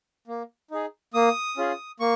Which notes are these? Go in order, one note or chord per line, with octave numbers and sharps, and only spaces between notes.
A#3
D#4 G#4
A#3 D#6
C#4 F4 G#4
A#3 C#6